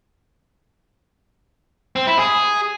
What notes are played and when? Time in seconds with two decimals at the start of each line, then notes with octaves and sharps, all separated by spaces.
1.96 C4
2.07 E4
2.19 G#4